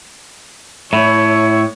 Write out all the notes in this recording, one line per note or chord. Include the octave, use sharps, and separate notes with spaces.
A2 E4 C#5